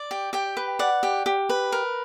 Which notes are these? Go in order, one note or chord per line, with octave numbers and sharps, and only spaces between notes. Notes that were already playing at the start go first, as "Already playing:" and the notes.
Already playing: D5
G4
G4 G5
B4
D5 F#5
G4
G4
B4
A#4